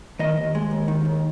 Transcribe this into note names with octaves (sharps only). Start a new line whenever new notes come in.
D#3 D#5
D#2
G#3
D#2
D#3
D#2